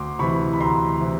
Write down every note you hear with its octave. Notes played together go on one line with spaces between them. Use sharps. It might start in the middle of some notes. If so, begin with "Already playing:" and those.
Already playing: D2 C6 D6
C3 E3 B5 C#6
B5
D2 A#5 C6
C3 E3